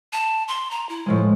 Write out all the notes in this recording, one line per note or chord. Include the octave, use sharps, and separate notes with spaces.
A5
C6
A#5
E4
A2 F3 G#3